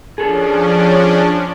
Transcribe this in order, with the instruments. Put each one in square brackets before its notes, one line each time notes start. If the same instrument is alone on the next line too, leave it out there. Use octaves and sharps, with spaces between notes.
[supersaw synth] F3 C#4 D4 [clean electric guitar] G#4 A4